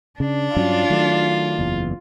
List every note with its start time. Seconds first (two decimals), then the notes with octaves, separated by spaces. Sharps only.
0.20 C#3 D4
0.56 G2 F#3 C#4 F4
0.90 D#3 F#3 A3
1.59 F#1 E2